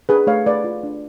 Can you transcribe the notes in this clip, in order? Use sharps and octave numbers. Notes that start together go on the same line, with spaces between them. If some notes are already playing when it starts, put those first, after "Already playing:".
D4 G#4 B4
A3 C#5 F5
A3 B4 D5
F4
D4